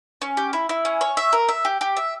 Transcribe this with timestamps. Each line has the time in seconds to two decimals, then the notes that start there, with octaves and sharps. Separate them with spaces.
0.22 C#4
0.37 G4
0.53 E4
0.69 E4
0.85 C#4
1.01 C#5
1.17 E5
1.33 A#4
1.49 E5
1.65 G4
1.81 G4
1.97 E5